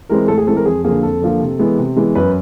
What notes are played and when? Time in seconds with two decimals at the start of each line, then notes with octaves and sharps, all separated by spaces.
0.09 E3 G#3 C4 A#4
0.28 A2 A4
0.38 G#4
0.47 E3 G#3 C4 A4
0.56 A#4
0.66 F2 G#4
0.84 D3 F3 A#3 G#4
1.03 F2 A4
1.21 D3 F3 A#3
1.40 C3
1.59 E3 G#3 B3
1.78 C3
1.96 E3 G#3 B3
2.15 F#2 B4